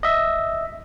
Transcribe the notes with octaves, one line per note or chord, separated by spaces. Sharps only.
D#5 E5